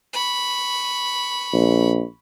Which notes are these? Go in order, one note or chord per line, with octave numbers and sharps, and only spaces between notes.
B5 C#6
A#1